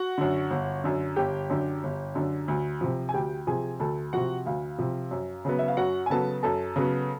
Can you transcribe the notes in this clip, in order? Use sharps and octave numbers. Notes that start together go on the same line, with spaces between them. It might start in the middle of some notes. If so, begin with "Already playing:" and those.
Already playing: F#4 F#5
F#2 D3
G1
F#2 D3
G1 G4 G5
F#2 D3
G1
F#2 D3
D2
C3 F3
G#5
D2 G4 G5
C3 F3 G#4 G#5
D2 A4 A5
C3 F3 F#4 F#5
D2 F5
C3 F3
F#2
C#3 F#3 B3
E5
F5
F#2 F#4 F#5
G#5
C#3 F#3 B3 A4 A5
F#2 A4 A5
C#3 F#3 B3